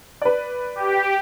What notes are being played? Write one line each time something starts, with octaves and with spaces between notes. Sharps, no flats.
B4 D5
G4